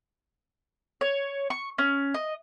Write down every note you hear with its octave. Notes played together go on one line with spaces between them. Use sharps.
C#5
C#6
C#4
D#5